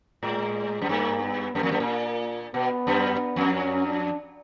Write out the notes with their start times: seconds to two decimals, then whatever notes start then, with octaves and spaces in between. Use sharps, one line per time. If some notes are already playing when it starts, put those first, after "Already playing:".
0.23 A2 G#3
0.81 F#2
0.89 G2 A#3
1.22 B3
1.54 F#2 A#3
1.63 F2
1.71 F#2
1.80 A#2
2.54 B2 B3
2.87 F#2
3.36 F2
3.52 C#4
3.86 D4